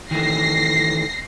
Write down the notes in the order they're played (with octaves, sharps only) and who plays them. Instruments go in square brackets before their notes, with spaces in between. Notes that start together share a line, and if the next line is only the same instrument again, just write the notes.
[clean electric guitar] D#3 E3 A3 [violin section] A#6 C7